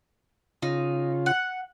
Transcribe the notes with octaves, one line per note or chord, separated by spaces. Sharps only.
C#3 D#4 F4
F#5